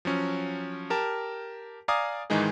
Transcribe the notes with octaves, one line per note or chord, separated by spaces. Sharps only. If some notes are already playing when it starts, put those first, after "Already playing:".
F3 F#3 C#4
G4 A#4 A5
D5 F5 G#5 A#5 D6 D#6
G#2 D#3 E3 G#3 D#4 G#4